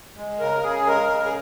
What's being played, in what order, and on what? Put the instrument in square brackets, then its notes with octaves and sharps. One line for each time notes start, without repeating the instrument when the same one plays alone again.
[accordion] G#3
C#3 A#4
C#3 G#4
G#3 A#4
C#3
G#4